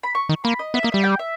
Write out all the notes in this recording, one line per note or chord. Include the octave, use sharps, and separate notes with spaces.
B5
C#6
D#3
A#3 B5
D#5
B3 E5
A#3 D#5
G3 E5
G5
E5